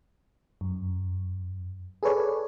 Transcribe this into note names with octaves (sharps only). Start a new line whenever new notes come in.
F#2
G#4 A4 B4 C#5 D5